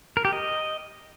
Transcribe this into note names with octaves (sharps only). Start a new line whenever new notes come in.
A#4
G4
D#5